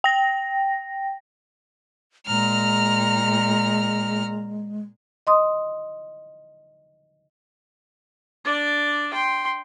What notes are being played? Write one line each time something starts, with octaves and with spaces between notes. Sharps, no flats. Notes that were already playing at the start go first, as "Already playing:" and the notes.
G5 A#6
A#2 G#3 A#5 F6
D#5 C6 D#6
D4 D5
G5 C6